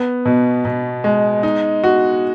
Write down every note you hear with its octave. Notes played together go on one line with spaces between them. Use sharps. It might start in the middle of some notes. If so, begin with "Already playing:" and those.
Already playing: B3
B2
B2
G#3
D#4
F#4